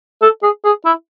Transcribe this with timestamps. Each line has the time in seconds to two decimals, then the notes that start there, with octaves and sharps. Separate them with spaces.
0.22 A4
0.43 G#4
0.65 G#4
0.85 E4